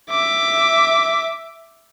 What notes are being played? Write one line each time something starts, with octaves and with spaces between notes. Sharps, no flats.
E5 D6